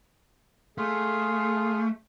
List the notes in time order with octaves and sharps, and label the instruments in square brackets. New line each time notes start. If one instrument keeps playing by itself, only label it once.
[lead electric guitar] A3 [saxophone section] F4 G#4